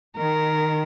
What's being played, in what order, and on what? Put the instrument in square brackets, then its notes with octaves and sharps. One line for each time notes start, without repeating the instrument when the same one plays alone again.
[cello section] D#3 [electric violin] A#4